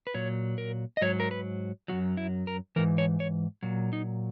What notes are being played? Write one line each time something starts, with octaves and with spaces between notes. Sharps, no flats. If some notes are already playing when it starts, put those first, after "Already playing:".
B4
A#2 F#3 C#5
A#4
D#5
G#2 F#3 C#5
A#4
B4
F#2 D#3 F#3 F#4
E4
A#4
G#2 E3 A#4
C#5
C#5
A#2 F#3
D#4